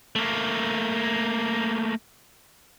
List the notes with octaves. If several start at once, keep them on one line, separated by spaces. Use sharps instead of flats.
A3 A#3